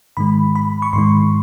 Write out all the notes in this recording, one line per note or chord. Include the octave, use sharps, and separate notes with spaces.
G#2 D#3 G#3 B5
B5
C#6
G#2 D#3 G#3 C6